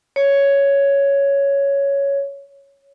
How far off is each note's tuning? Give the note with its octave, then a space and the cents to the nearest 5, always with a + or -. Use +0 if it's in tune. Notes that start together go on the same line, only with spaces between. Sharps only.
C#5 +5